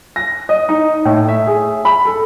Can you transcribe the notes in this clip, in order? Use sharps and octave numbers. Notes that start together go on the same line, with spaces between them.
A#6
D#5
D#4
A2
E5
G#4
B5
A4